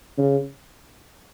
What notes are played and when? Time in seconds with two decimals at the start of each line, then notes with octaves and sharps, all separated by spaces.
0.18 C#3